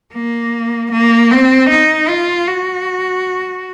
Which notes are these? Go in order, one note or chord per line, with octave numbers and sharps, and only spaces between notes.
A#3
A#3
C4
D#4
F4
F#4